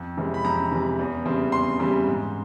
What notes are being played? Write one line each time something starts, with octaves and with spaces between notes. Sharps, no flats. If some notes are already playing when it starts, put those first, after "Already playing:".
Already playing: F2
C3 E3 G#3 C#4
B5
F2 A#5
C3 E3 G#3 C#4
E2
C#3 E3 G3 C4
E2 C6
C#3 E3 G3 C4
G#2